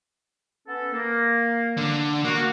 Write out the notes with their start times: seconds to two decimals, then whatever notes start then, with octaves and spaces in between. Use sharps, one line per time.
0.67 B3 C#4 A4
0.93 A#3
1.77 D3
2.24 A#3 F#4